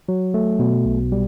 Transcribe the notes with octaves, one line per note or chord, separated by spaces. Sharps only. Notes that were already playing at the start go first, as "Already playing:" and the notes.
F#3
A3
B2
B1
G3